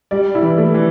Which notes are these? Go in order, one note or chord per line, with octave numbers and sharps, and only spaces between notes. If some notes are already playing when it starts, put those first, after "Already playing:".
G3 D5
E4
E3
A3
E3